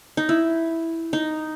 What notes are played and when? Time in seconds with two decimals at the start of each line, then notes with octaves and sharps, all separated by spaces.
0.17 D#4
0.29 E4
1.13 D#4